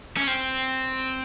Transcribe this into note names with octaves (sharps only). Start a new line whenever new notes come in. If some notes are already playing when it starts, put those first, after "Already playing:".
C#4
C4